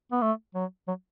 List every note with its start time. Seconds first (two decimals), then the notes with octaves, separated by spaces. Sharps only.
0.12 B3
0.22 A3
0.55 F#3
0.88 F#3